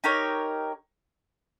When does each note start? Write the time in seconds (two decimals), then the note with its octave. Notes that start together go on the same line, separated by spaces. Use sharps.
0.04 D#4 G4 A#4 C#5